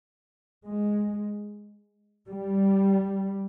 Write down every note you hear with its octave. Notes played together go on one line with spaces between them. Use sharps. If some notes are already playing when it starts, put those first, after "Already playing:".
G#3
G3